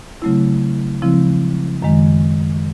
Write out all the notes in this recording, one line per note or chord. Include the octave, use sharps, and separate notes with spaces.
C#3 F#3 A3 C4 E4
C#3 F3 G#3 C4 E4
F#2 D#3 G#3